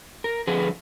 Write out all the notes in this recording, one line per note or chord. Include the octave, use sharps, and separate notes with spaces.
A#4
D3 F3 G#4 B4